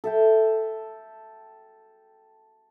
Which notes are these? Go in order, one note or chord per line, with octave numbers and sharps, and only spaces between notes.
A4 E5 G5